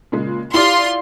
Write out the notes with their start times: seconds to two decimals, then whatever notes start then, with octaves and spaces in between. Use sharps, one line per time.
0.12 A#2 C#3 G#3
0.54 E4 F4 G4 D5 C6